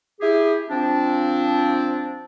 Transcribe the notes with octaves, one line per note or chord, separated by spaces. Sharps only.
E4 G4 G#4
F3 C4 D4